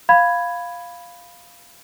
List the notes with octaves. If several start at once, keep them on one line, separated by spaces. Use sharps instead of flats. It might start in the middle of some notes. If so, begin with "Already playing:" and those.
F5 B5 G#6